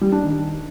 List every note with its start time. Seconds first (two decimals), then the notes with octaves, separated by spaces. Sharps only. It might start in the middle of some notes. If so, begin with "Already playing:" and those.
0.01 G3
0.12 D4
0.23 D#3